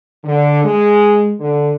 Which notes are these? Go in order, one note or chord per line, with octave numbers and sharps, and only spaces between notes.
D3
G#3
D3